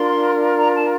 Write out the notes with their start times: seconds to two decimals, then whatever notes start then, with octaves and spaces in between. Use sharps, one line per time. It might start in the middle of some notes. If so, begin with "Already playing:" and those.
Already playing: D4 F4 A#4 C6
0.58 A#5
0.75 A5